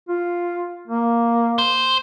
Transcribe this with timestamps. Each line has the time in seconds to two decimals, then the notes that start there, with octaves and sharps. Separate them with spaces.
0.09 F4
0.88 A#3
1.58 C5